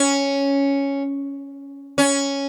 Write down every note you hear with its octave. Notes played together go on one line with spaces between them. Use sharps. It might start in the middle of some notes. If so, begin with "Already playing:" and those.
Already playing: C#4
C#4